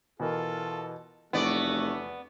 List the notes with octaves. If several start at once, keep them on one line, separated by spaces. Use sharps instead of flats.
B2 E3 F4 A4 A#4
F1 E2 A3 B3 F#4 D5